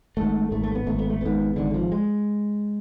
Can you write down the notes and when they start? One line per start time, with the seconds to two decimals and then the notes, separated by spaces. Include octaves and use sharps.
0.17 G#1 G#2 A3
0.51 G#1 G#2 A3
0.64 A3
0.75 B3
0.86 G#1 G#2 A3
0.99 B3
1.10 A3
1.21 G#1 G#2 B3
1.56 G#1 G#2 D3
1.74 F3
1.92 G#3